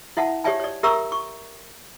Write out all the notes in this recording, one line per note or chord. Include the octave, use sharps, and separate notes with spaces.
E4 E5 F#5 A5
G4 C#5 D5 E5 G#5 A5
C#5 D5
G4 A#4 E5 A#5 C#6 E6
C#6